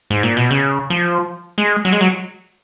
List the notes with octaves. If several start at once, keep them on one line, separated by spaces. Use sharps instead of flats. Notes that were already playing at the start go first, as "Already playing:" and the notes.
G#2
A#2
B2
C#3
F3
G#3
F#3
G#3
F#3